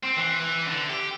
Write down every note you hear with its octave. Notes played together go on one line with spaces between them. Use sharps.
C4
E3
E3
D3
G4